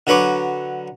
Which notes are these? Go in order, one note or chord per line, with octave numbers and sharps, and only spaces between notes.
D3 F#3 B4 C#6 D6